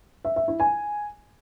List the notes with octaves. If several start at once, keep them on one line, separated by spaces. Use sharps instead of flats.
E5
E5
E4
G#5